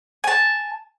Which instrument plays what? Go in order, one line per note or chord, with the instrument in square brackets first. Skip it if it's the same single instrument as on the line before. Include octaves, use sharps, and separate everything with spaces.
[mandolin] G#5 A5